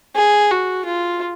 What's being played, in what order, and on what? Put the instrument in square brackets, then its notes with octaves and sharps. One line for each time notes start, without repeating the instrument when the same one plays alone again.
[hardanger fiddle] G#4
F#4
F4